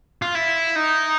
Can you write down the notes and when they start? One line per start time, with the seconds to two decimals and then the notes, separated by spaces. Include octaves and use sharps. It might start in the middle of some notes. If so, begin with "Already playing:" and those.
0.22 F4
0.35 E4
0.76 D#4